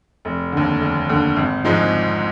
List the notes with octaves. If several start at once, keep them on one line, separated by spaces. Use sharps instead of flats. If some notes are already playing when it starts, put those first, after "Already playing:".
F1
D#2 D3
F1
D#2 D3
G#1
G#2 F3 G#3 D#4